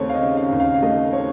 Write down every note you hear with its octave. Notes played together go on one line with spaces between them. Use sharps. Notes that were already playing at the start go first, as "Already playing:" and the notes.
Already playing: D#2 C#3 A3 C4 C#5
F5
D#5
C#3
F5
D#2
F5
F5
A3 D#5
C4 C#5